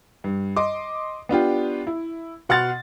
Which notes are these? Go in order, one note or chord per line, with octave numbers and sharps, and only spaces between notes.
G2
D#5 C6 D6
B3 D4 F4 G4
E4
B2 F#5 C6 F6 A6